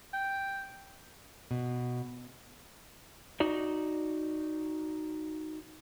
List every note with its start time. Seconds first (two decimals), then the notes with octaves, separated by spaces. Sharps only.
0.14 G5
1.51 B2
3.40 D#4 F#4 D5